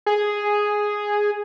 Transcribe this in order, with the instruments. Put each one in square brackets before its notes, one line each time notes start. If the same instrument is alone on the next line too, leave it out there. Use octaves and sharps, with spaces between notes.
[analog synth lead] G#4